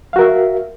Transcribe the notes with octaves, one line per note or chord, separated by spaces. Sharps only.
F#4 A#4 E5 F5